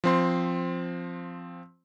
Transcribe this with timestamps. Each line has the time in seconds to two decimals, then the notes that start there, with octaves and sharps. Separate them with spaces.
0.04 F3 C4 C6